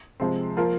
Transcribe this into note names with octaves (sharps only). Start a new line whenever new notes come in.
C3 F3 G#3 C4
F3 A#3 F4 A#4